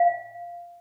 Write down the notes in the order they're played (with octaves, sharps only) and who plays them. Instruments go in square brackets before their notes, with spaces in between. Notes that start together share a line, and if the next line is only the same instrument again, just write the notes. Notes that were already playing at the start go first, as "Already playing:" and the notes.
Already playing: [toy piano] F5